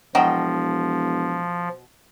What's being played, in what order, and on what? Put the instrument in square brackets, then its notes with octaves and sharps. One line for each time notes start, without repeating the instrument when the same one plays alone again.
[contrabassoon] E1 [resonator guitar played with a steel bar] B2 D#5 G5 [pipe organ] F3 [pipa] F#3